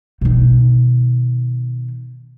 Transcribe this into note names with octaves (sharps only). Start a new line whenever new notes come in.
B2 D#3